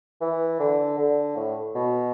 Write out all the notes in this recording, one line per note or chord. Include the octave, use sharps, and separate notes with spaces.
E3
D3
D3
A2
B2